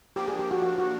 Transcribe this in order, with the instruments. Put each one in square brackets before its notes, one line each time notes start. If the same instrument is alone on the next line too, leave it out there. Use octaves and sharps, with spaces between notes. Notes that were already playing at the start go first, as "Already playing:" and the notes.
[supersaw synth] F3 A#3 D4 [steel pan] G4
[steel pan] G#4
G4
F#4
F#4
F#4